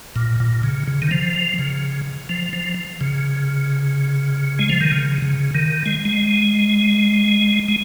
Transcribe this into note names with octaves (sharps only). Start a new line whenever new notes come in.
A#2
A#2
C#3
C#3
D#3
F3
C#3
F3
F3
C#3
G#3
F3
D#3
C#3
C#3
D#3
G#3
G#3
G#3